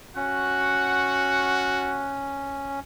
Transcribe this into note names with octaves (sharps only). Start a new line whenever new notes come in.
C#4 F#4 F#5